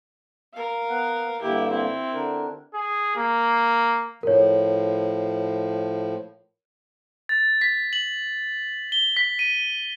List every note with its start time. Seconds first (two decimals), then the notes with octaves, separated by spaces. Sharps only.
0.54 A#4 F5
0.89 B3 F#5
1.42 G2 D3 A#3 E4 G4
1.70 C4 E4
2.14 D3 D4 A#4
2.74 G#4
3.16 A#3
4.23 A2 F3 A#4 C#5
7.29 A6
7.61 B6
7.93 F#7
8.92 G7
9.17 B6
9.39 D#7